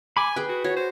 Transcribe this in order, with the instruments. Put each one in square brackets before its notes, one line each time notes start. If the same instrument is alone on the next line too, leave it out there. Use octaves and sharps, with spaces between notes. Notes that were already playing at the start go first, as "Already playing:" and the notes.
[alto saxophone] G#5 [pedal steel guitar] B5 D6
[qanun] G#4 G5 [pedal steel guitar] B4
[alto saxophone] F#4
[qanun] F#4 [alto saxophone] C#5
[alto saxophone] C5